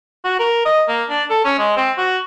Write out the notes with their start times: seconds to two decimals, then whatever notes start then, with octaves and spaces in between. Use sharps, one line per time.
0.24 F#4
0.39 A#4
0.65 D#5
0.88 A#3
1.09 D4
1.30 A4
1.44 C#4
1.59 G#3
1.76 C4
1.98 F#4